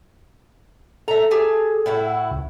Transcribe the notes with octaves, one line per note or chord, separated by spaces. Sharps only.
A4 E5 A#5
G4 G#4 A5
A2 E4 F#4
C#2